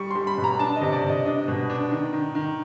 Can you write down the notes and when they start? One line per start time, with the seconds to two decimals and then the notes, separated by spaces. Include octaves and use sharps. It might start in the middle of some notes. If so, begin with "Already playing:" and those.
Already playing: G3 C#6
0.11 G3 C6
0.27 B5
0.38 B2
0.44 A#5
0.59 D4 A5
0.76 D#5
0.81 C3
0.93 D5
1.04 C3
1.10 D#5
1.25 D4 D#5
1.48 B2
1.70 D4
1.92 D#3
2.13 D#3
2.35 D#3